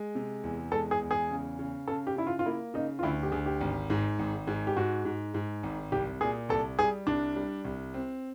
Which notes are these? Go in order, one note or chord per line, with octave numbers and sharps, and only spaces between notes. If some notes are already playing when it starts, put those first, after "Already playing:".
Already playing: G#3
C3
E2
G#3 A4
G#4
E2
G#4
C#3
C#3
C#3 A4
G4
C#3 E4
F4
F4
A#3 E4
C#3 D#4
F4
D2 E4
G4
D2 G#4
G4
G#1
G#2
G#1
G#2
G4
G#2 F#4
G#2
G#2
G#1
C2 G4
A#2 G#4
C2 A4
G3 G#4
C2 D4
G3
C2
C4